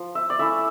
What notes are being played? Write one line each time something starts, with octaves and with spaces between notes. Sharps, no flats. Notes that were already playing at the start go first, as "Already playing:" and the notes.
Already playing: F3
E5
D5
A3 C#4 E4 E5